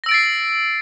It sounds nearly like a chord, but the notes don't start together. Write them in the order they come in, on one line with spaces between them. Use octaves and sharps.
A#6 E6 D7 A6 C7